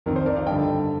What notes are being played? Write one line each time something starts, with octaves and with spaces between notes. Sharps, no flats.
F2 D#3 A#4
C5
A#4 D5
D5 F5
G2 D3 D#5 G5